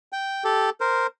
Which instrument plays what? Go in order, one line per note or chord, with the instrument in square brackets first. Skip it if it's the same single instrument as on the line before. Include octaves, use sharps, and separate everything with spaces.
[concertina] G5
G4 A4
A#4 C5